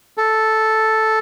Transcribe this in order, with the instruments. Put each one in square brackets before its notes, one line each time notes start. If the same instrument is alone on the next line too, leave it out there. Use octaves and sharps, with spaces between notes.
[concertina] A4